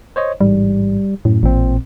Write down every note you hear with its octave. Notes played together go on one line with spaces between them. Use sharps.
C5 C#5 D#5
A1 G#2 G3
F#2 A2
A1 A#2 C4